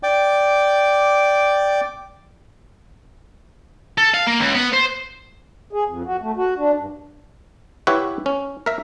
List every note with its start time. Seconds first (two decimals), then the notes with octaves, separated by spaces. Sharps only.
0.03 D5 G5 D6
3.98 A4
4.14 F5
4.27 A#3
4.39 C#2
4.55 B3
4.73 C5
5.73 G#4
5.88 F2
6.06 F#4
6.22 A3
6.37 F#4
6.57 D4
6.78 G2
7.87 E4 G4 B4 C#5 F#5
8.26 C#4
8.66 A#4 E5